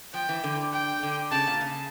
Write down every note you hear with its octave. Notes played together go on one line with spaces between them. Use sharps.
F3 G5
E3
D3
G5
D3
C#3 A5
A#2
C#3